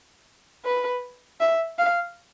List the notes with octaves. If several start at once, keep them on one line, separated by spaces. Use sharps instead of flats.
B4
E5
F5